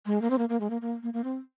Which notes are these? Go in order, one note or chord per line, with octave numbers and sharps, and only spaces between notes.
G#3
A#3
C4
A#3
A#3
G#3
A#3
A#3
A#3
A#3
C4